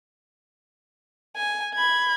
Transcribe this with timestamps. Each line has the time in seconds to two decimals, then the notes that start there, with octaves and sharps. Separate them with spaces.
1.36 G#5
1.75 B5 G#6